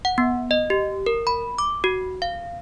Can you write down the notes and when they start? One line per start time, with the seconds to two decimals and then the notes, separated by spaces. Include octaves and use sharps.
0.05 F#5
0.18 B3
0.51 D#5
0.70 G4
1.06 A#4
1.27 B5
1.59 D6
1.84 F#4
2.22 F5